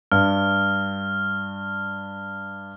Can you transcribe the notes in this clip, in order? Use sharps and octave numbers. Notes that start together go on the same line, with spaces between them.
G2 F6